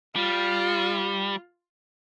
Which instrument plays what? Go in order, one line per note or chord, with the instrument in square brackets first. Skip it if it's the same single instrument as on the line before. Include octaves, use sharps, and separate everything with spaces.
[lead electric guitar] G3 [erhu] F4